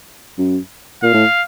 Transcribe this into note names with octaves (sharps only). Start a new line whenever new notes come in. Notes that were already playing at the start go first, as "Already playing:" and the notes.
F#2
A#2 F5
A2